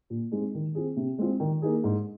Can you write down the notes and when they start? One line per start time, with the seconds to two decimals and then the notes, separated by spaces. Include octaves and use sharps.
0.10 A#2
0.32 G#3 C4 D#4 G#4
0.54 D#3
0.75 C4 F4 G#4
0.96 C3
1.19 G#3 C4 F4
1.40 D#3
1.62 A#3 D#4 G#4
1.84 G#2